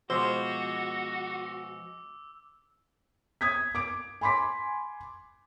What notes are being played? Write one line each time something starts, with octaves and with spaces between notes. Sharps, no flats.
B2 F3 G#3 F#4 C5 D6 E6
D#6 G#6 B6
D6 D7
G#5 B5 C6 D6 B6